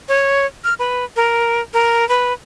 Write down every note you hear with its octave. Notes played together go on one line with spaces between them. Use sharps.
C#5
F6
B4
A#4
A#4
B4